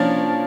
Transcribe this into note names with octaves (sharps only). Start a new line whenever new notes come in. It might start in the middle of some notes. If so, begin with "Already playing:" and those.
Already playing: F3 A#3 C#4 D4